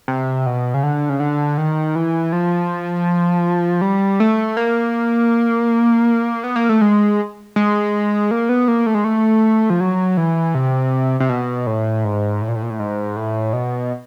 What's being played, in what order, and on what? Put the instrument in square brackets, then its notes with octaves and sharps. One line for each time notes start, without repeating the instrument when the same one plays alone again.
[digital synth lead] C3
B2
C#3
D3
C#3
D3
D#3
E3
F3
G3
A3
A#3
B3
A#3
A3
G#3
G#3
A#3
B3
A#3
A3
G#3
A3
F3
F#3
E3
C3
C3
B2
A2
G#2
A2
A#2
A2
A#2
A2
G#2
A2
B2